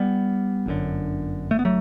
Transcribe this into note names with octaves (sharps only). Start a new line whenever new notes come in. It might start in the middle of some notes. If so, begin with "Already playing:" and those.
Already playing: G3 B3
G1 F#2 D3
A3
B3
F#3 A3